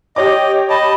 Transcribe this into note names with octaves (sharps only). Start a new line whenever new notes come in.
G4 C#5 D#5 D6
D#5 A5 B5